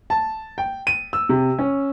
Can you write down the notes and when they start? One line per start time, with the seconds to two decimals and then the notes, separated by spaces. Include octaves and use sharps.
0.10 A5
0.58 G5
0.87 D#7
1.13 E6
1.29 C3
1.59 C#4